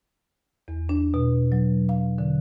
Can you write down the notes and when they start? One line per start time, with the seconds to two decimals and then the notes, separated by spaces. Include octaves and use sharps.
0.68 E2
0.89 D4
1.14 B2
1.52 F#3
1.89 F5
2.18 D3